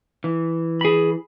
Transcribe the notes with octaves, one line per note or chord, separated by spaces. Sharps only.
E3
G#4 B5